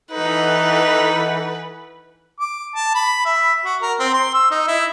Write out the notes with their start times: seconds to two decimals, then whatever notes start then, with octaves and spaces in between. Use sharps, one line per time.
0.11 E3 D#4 A4 B4 F#5
2.40 D6
2.76 A5
2.95 B5
3.25 E5
3.65 F#4
3.82 A#4
4.00 C4
4.14 C6
4.34 E6
4.51 D#4
4.68 E4